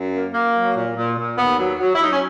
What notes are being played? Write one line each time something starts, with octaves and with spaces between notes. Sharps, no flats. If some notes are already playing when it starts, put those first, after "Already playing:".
Already playing: F#2
A#3
A#3
F#3
A#2
A#2
A#2
D#2 B3
F#3
F#3
E4
F#3 D#4
C#4